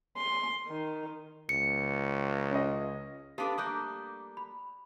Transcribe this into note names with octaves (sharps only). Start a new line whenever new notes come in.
C6
D#3
C#2 C#7
C#4 D#5
B3 D4 G4 A4 F5 A5
G3 A3 A#3 D#6 F#6 G6
B5